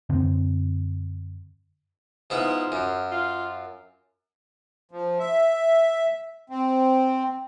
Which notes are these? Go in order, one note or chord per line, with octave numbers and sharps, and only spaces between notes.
F#2 D3 C4
G#2 B3 E4 F4
F#2
F4
F3
E5
C4